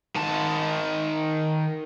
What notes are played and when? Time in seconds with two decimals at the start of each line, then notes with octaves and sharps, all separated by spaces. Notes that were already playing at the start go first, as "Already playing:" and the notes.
0.16 D#3 A5